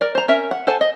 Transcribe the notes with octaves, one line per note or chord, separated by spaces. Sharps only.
A#4 D5
C5 A#5
C#4 A#4 E5
F#5
A4 C5 F#5 G#5 A5
D#5